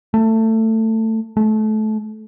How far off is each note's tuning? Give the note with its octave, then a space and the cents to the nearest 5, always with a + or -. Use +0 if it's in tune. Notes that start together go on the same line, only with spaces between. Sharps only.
A3 +20
A3 -25